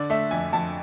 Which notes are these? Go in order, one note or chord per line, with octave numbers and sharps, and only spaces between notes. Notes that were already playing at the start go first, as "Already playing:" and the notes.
Already playing: D3 D5
A3 E5
F2 G#5
F2 A5